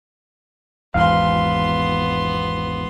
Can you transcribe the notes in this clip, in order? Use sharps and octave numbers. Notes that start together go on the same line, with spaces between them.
G#1 E2 G#2 B3 F5 C6